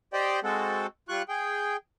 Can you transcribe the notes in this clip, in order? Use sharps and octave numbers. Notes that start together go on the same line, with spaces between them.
G4 C5 D5 D#5 G5
G#3 C4 F#4 A4
G3 F4 C#6 F#6
G#4 G5